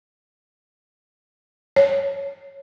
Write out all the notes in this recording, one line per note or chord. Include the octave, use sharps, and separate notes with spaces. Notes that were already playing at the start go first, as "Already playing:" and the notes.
C#5